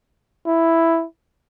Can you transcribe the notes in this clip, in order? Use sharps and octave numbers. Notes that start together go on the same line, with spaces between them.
E4